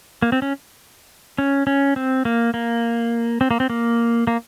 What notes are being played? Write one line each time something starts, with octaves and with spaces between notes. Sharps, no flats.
A#3
C4
C#4
C#4
C#4
C4
A#3
A#3
C4
A#3
C4
A#3
A#3